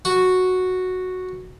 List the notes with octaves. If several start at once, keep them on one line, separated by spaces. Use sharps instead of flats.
F#4